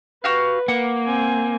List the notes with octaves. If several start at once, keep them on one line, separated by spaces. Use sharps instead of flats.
F#4 G4 B4 F5
A#3 F#5
C4 G#5